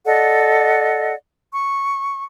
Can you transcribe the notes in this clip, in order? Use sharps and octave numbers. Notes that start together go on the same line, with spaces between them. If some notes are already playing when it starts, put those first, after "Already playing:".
A4 D5 D#5 F#5
C#6